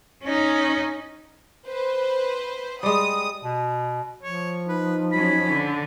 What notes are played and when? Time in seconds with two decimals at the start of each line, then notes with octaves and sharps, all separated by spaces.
0.24 C#4 D#4
1.68 B4 C5
2.83 G3 G#3 D#6
3.43 B2
4.23 F3 C#5
4.69 D#4 B4
5.12 F#3 C#4 B5
5.48 D3